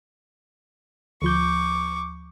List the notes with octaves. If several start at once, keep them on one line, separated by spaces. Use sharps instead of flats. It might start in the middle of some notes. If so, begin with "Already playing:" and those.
D2 F3 C#6 D6 G6